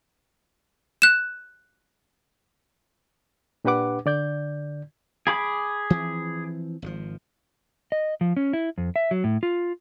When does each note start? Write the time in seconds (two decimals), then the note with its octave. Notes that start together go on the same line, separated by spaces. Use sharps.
1.02 F#6 E7
3.65 A#2 D4 G4 B4 F#5 D6
4.06 D3 D5 G6
5.27 G#4 B5 D6
5.90 E3 F3 C4
6.82 G#1 C3 F3
7.92 D#5
8.21 F3
8.37 C#4
8.53 E4
8.78 F2
8.96 E5
9.11 F#3
9.24 A2
9.43 F4